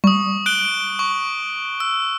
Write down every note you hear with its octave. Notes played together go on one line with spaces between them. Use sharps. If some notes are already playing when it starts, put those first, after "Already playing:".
G3 C#6 D#6
F#6 D7 G7
C#6
E6